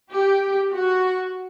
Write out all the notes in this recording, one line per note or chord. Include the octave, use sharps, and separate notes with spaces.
G4
F#4